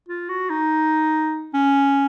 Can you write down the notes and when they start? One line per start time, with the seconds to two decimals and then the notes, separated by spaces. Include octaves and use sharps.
0.08 F4
0.29 F#4
0.50 D#4
1.54 C#4